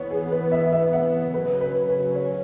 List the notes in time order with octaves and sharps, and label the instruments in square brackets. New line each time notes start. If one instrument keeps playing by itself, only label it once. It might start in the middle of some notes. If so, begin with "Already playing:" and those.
Already playing: [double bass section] E3 B3 [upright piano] C#5
[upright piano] G#4
B4
E5
E5
F#5
[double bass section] C#3 F#3 C#4 [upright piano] B4
[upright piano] B4
B4
C#5